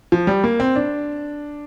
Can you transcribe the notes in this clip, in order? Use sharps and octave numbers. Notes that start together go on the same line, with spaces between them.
F3
G3
A#3
C4
D4